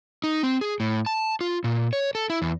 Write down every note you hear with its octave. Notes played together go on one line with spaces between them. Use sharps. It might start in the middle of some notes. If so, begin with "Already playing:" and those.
D#4
C4
G#4
A2
A5
F4
A#2
C#5
A4
E4
E2